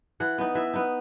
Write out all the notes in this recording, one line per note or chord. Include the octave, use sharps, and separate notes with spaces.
E3 F#5
B3 D#4
E3 E5
B3 D#4